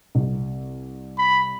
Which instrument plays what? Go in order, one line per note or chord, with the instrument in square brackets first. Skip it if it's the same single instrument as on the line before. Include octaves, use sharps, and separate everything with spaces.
[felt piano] C2
[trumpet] B5